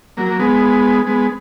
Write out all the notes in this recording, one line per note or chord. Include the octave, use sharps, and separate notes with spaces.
F#3 A#3
G#3 B3
G#3 B3